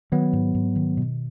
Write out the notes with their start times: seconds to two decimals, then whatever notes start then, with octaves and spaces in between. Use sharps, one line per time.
0.12 D#3 F#3 B3
0.33 G#2
0.55 G#2
0.76 D#3
0.97 B2